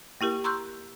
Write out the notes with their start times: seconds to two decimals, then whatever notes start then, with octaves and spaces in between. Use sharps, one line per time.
0.21 A#3 E4 G4 A#4
0.44 A#5 C6 C#6 E6 F#6 G6